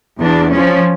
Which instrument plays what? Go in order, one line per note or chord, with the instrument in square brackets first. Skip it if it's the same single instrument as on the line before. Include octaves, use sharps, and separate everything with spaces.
[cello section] E2 D4
F3 C#4